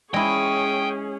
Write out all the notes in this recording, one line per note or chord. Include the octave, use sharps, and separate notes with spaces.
G#3 C#4 E4 G#4 G5 C#6 D#6